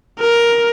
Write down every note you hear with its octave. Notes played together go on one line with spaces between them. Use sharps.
A#4